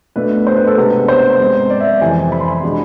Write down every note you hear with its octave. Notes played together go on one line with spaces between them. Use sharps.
B2 A3 D4 B4
C5
B4
A4
C3 G#3 B3 D4 B4
C5
G#2 G#3 C4
D5
E5
E5
F2 C3 E3 G#5
B5
C6
B5
B2 G#3 D4